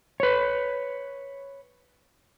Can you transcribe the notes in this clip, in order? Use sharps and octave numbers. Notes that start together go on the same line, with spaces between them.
B4 C#5